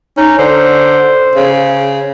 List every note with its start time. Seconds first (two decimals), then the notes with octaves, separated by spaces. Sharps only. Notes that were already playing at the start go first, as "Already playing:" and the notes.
0.17 C#4 D#4
0.39 D3 C5
1.36 C#3